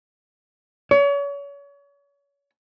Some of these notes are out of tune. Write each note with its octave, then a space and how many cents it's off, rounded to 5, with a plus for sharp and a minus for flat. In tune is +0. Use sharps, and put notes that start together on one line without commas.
C#5 +35